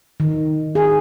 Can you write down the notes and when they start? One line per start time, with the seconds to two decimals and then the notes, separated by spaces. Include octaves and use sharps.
0.20 D#3
0.75 G#4